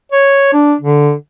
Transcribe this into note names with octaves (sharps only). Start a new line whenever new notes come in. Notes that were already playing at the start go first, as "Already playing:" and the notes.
C#5
D4
D3